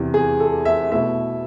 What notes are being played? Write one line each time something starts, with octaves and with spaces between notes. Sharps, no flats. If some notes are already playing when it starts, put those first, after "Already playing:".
Already playing: E2 C3 E3
G#4
A4
E5
B2 A3 E4 E5